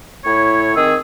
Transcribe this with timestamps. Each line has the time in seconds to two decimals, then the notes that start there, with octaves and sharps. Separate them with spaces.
0.25 A2 E4 C#5
0.75 D#3 C4 G#4 E6